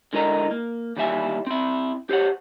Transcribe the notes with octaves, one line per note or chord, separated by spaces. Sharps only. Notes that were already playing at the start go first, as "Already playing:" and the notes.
D3 G#3 E4 A#4 D#5 A#5
A#3
D#2 E3 G3 G#4 E5 G#5
C4 E4
G4 C5 C#5 F#5